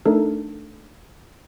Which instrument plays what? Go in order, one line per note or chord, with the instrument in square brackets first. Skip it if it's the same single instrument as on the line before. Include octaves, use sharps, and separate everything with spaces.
[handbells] A3 D4 D#4 A4 A#4